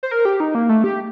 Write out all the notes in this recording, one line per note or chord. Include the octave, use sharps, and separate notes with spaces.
C5
A#4
G4
D#4
A#3
A3
G4